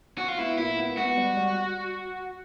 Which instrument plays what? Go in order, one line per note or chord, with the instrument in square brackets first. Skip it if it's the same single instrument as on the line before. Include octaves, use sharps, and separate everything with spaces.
[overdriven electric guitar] F#4
F4
[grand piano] B3 [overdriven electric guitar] E4
[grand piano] A#2 [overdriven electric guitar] E4
[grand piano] B3
[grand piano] B3 [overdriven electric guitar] F#4
[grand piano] G3
G3